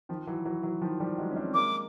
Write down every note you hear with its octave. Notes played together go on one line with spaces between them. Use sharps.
D#3 F3
E3 F#3
E3 F#3
E3 F#3
D#3 F3
F3 G3
F#3 G#3
C#4
C4 D4
G#3 A#3 D6